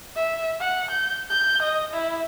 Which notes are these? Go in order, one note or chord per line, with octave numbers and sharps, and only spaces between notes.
E5
F#5
G6
G6
D#5
E4